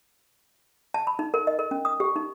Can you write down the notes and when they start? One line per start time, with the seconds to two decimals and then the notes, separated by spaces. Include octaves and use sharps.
0.94 A5
1.07 B5
1.19 D#4
1.34 A#4
1.47 D#5
1.59 A#4
1.71 C#4
1.85 D#6
2.00 G4
2.16 D#4